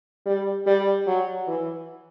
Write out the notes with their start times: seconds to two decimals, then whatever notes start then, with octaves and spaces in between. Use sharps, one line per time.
0.26 G3
0.66 G3
1.07 F#3
1.47 E3